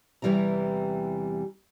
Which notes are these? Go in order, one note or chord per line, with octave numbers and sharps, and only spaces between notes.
E2 C3 E3 G3 E4 A#5